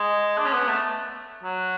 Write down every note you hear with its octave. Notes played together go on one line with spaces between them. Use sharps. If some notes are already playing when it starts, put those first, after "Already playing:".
Already playing: G#3
D4
C#4
B3
A3
F#3